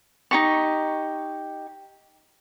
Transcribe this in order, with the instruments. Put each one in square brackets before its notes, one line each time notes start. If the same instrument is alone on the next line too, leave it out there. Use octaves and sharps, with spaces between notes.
[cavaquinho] D#4 G4 C#6